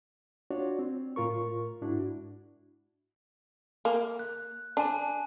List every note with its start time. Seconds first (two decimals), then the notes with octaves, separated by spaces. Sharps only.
0.51 D4 F4 F#4 C#5 D5
0.79 C4
1.16 A2 F4 A#4 C#6
1.82 G#2 D4 E4 F#4
3.85 A#3
4.19 F#6
4.77 D4 G#5 A5